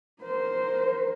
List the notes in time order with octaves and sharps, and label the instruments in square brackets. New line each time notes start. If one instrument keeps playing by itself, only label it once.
[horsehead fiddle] A#4 C5